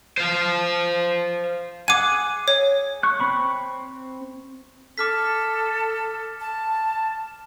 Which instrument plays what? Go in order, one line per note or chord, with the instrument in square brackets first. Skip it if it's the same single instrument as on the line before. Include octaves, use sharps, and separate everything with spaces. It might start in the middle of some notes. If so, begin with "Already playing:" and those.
[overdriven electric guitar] C5 F5
[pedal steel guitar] G#4 F#5 G#5 [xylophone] D6 D#7
[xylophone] C#5
[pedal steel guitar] C#6 F#6
C4 B5 C#6
[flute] A4 [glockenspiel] D6 F6 B6
[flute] A5